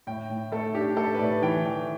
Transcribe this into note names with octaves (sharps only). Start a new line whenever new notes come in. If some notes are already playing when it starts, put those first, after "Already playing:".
A2 G5
A2
A3 A4
D4 G4
A2 A4
B4
A2 D5
E3 G5
E3